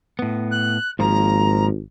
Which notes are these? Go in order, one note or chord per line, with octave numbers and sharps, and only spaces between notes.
A2 B3
F#6
G#1 G#2 F3 A#3 A#5